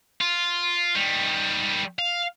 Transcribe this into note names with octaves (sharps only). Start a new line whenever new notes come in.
F4
D#3 G3
F5